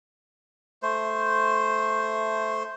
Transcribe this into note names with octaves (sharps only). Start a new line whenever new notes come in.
A3 C5